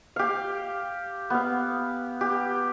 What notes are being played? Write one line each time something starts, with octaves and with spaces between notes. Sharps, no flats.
G4 F5
B3 F5
G4